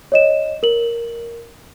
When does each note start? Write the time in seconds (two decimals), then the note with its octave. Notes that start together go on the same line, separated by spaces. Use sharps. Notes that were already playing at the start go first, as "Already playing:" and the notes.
0.12 C#5 D#5 E7
0.63 A#4 F#7